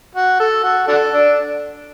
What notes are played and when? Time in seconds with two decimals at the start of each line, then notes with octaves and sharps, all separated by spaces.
0.15 F#4
0.40 A4
0.64 F#4
0.88 D4 F#4 A4
1.13 D4